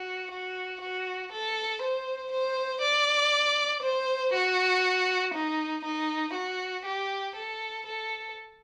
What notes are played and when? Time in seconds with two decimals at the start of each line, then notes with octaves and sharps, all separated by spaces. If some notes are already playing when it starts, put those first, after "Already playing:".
Already playing: F#4
0.31 F#4
0.81 F#4
1.32 A4
1.82 C5
2.32 C5
2.82 D5
3.83 C5
4.34 F#4
5.34 D#4
5.85 D#4
6.34 F#4
6.85 G4
7.36 A4
7.86 A4